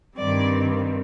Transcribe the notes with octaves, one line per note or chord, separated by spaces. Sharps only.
G2 D#3 G3 C4 D5